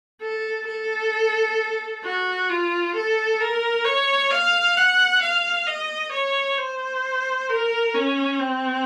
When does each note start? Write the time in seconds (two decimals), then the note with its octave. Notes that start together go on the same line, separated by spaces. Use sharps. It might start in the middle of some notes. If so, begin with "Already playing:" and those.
0.22 A4
0.67 A4
2.04 F#4
2.49 F4
2.95 A4
3.40 A#4
3.85 C#5
4.31 F5
4.76 F#5
5.22 F5
5.67 D#5
6.12 C#5
6.58 C5
7.49 A#4
7.95 C#4
8.39 C4